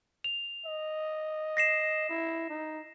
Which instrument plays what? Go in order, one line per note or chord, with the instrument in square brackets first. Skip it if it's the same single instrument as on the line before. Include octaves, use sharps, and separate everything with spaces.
[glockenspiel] F7
[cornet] D#5
[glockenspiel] A#6 C7 E7
[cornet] E4
D#4